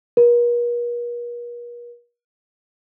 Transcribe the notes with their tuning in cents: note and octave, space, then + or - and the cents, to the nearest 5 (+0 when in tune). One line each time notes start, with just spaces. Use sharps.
A#4 +45